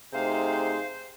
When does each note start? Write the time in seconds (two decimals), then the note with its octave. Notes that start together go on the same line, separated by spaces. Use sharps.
0.14 C3 A3 D#4 G#4 C5 F5